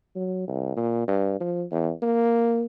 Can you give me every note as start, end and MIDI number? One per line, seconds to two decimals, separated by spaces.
0.16 0.45 54
0.48 0.76 36
0.77 1.06 46
1.08 1.37 43
1.41 1.64 53
1.72 1.92 40
2.02 2.65 58